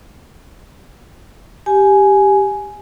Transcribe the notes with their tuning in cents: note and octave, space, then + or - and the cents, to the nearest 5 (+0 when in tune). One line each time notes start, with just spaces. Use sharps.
G4 +0 G#5 +10